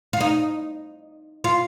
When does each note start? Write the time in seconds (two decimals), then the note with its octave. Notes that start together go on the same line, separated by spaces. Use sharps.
0.13 F4
0.21 D#4
1.44 F4